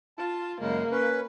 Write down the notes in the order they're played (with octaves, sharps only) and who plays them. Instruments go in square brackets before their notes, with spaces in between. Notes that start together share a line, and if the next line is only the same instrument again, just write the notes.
[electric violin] F4 [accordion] A5
[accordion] F#2 C#3 G#3 [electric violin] A#3
[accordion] C#4 B4